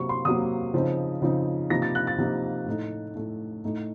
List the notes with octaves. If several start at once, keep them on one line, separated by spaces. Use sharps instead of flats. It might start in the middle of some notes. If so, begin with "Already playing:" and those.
Already playing: C3 F#3 A#3 C#6
C6
C3 F#3 A#3 D#6
C#3 F3 C4 D#4
C#3 F3 C4 D#4
C3 F3 A#3 D#4 A#6
A6
F#6
A6
C3 F3 A#3 D#4
A2 A3 D#4
A2 A3 D#4
A2 A3 D#4